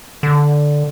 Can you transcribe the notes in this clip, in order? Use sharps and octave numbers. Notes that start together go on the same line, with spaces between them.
D3